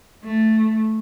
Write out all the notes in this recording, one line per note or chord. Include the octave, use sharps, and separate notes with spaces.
A3